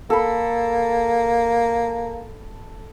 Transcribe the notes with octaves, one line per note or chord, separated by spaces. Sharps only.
A#3 A4 B5